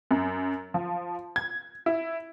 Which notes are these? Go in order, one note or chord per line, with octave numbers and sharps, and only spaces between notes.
F#2
F3
G#6
E4